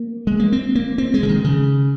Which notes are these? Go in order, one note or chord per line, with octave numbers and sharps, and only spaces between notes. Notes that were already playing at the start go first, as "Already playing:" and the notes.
Already playing: A#3
G#3
A#3
C4
A#3
C4
G#3
C#3
D#3
C#3